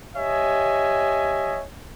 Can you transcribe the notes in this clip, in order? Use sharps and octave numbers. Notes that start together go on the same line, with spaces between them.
G4 C#5 D#5 E5 G#5